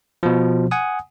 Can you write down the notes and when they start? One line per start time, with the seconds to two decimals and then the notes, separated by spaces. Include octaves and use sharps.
0.23 B2 F3
0.71 F#5 G#5 D#6